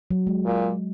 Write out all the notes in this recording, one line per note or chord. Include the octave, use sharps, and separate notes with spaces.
F#3
G#3
A#2